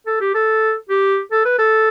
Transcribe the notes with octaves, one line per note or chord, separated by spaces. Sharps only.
A4
G4
A4
G4
A4
B4
A4